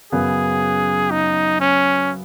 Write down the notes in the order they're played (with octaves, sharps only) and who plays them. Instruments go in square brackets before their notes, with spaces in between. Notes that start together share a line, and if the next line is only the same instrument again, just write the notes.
[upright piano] F#2 C#3 B3 [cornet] G#4
[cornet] D#4
C#4